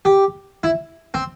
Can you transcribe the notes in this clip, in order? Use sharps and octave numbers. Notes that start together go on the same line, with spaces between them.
G4
E4
C4